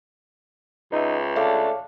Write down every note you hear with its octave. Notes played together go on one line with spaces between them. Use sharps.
C#2 D#4 B4 E5
A3 D4 C#5 F5 D6